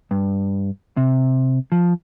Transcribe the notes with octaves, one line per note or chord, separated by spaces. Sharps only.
G2
C3
F3